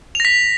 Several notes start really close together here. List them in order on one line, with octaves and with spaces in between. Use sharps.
F7 A#6 B6